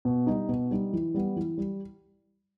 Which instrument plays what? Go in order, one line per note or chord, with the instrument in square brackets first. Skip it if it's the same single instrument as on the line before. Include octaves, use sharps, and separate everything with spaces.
[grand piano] B2
G3 D#4
B2
G3 D#4
E3
G3 B3
E3
G3